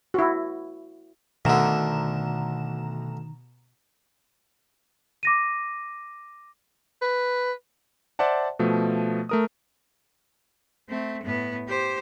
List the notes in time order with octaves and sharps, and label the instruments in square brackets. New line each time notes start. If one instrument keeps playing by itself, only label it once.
[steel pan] E4 F#4
[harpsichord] D2 D3 [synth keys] B2 A#5 E7 [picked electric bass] D#3
[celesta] D6 A#6 D#7
[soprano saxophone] B4
[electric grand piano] C5 D5 E5 F#5 A5
B2 F3 A3
A3 A#4 D#6
[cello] A3 C4
A2 B3
G4 C5